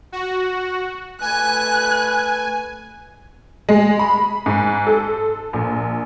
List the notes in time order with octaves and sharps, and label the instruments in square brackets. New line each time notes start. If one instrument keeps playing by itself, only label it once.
[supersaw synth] F#4
[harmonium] A3 B4 [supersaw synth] G#5 [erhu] F#6
[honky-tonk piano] G#3
B5
G#2
A4
A#1